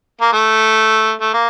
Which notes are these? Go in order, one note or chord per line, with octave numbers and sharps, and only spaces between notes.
A#3
A3
A3
A#3